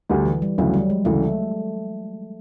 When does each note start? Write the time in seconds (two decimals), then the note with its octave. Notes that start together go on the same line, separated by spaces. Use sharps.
0.09 D2 D3 G3
0.25 E3
0.42 G3
0.58 D2 C#3 E3 F#3
0.74 G3
0.90 G#3
1.05 D2 C#3 E3 A3